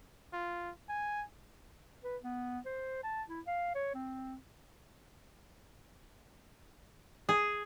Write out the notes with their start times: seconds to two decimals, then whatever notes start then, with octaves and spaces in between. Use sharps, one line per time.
0.33 F4
0.89 G#5
2.04 B4
2.23 B3
2.66 C5
3.04 A5
3.30 E4
3.47 F5
3.75 C#5
3.95 C4
7.29 G#4